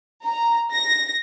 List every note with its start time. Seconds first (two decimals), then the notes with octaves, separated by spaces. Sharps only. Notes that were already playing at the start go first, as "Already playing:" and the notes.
0.24 A#5
0.72 A#6